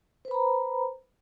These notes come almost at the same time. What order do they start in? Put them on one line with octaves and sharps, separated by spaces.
C5 B4 B5 A#5